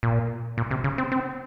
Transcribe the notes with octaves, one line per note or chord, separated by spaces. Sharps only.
A#2
A#2
C3
C#3
C4
C4